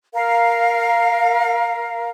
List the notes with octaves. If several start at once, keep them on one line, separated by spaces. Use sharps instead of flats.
A#4 F5